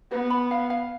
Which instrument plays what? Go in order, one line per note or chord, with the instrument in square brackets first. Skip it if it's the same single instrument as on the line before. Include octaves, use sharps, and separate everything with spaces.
[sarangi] B3 [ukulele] B4
[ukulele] B5
F5
F5